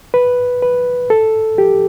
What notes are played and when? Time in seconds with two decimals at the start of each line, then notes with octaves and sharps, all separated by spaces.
0.14 B4
0.62 B4
1.10 A4
1.58 G4